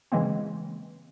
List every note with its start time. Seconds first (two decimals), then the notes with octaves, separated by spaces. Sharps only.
0.12 C#3 E3 G#3 A#3 C4